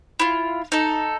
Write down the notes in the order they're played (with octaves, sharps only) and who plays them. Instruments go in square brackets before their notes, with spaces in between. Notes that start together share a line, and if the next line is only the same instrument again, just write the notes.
[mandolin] E4 F4
D#4 A4